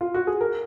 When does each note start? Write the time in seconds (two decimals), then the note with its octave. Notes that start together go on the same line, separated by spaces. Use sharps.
0.01 F4
0.14 F#4
0.27 G#4
0.41 A#4